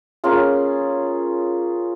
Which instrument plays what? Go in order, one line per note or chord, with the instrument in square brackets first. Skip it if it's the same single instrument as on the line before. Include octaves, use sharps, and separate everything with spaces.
[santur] A#3 C#4 F4 G#4